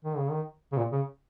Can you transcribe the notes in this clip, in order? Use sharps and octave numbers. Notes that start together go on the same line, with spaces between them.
D#3
C#3
D#3
C#3
A#2
C#3